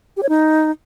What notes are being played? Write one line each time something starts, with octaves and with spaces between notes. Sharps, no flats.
G4
C#5
D#4